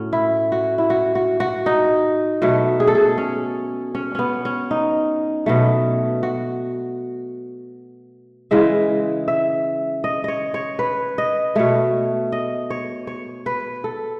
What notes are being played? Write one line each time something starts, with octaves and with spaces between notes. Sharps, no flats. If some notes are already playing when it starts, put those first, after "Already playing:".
Already playing: A2 C#4 F#4
E4
F#4
E4
F#4
F#4
F#4
D#4
B2 F#3 A3
G#4
A4
G#4
C#4
C#4
B3 C#4
C#4
D#4
B2 F#3 A3
F#4
C#3 E3 G#3 E5
E5
D#5
C#5 D#5
C#5
B4
D#5
B2 A3 C#5
D#5
C#5
C#5
B4
A4